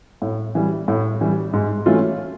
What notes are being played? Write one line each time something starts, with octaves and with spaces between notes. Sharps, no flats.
A2
E3 G3
A2
E3 G3
G#2
E3 A3 C#4 F4